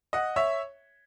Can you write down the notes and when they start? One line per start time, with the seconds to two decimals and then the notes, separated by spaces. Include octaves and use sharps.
0.13 D#5 F#5
0.36 C#5 E5